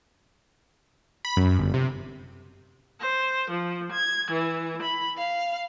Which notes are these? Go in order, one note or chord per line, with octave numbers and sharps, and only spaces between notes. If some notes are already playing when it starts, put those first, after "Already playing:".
B5
F#2
G1
C3
C5
F3
G#6
E3
B5
F5